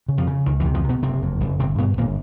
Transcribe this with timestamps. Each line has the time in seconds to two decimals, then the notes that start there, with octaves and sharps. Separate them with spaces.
0.08 C#3
0.18 F2 F3
0.27 C#3
0.46 C#2 D#3
0.60 E2 E3
0.65 C3
0.74 F2 F3
0.84 C3
0.89 B2 B3
1.02 F#1 C3 C4
1.22 F2
1.41 F#1
1.59 G1 C3 C4
1.78 G2 B2 B3
1.97 G1 A#2 A#3